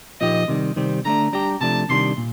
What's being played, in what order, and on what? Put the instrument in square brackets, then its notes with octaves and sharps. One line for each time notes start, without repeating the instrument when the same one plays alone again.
[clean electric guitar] A#2 F3 A#3 D#4 G4 [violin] D#5
[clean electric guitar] C3 D#3 G3
C3 D#3 G3 C4
[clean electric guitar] D3 A3 D4 [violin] A#5
[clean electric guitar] G3 D4 G4 [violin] A#5
[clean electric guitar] C3 F3 A3 D4 [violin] A5
[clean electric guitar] C3 D#3 G3 D4 [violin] C6
[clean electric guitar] A#2